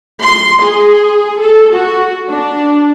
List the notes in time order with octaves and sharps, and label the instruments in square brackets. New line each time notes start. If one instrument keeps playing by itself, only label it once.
[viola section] C6
G#4
A4
F#4
D4